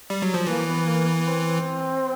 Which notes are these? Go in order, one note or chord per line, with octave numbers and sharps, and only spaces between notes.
G3
F#3
F3
E3 A#3
B3
A#3
B3
C4